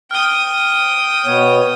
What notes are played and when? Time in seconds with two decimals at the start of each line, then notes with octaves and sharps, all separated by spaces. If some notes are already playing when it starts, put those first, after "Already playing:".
0.11 G5 D#6 F6 G7
1.26 B2 B3 C#5